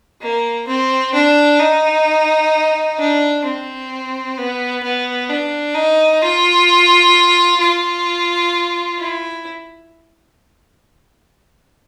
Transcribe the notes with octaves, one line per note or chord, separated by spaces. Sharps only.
A#3
C4
D4
D#4
D4
C4
B3
B3
D4
D#4
F4
F4
E4